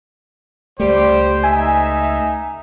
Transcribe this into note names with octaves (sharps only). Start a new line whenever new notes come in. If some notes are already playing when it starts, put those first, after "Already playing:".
C#2 G3 A3 G4 C5
D#4 E5 G#5